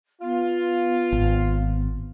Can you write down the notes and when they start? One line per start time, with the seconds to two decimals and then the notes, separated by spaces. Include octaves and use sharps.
0.22 B3 F4
1.12 G#1